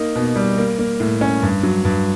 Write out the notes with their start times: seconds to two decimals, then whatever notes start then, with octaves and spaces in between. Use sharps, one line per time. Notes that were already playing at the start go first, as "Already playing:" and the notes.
Already playing: A#3 D#4
0.15 B2
0.36 G3
0.58 A#3
0.79 A#3
1.00 A2
1.21 C#4
1.42 G2
1.63 F#3
1.85 G2